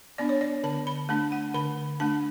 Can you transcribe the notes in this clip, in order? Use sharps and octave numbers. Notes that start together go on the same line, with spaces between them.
B3 D4 D5
C#5
D5
D3 A5
B5
A3 D4 A5
F#5
D3 B5
A3 D4 A5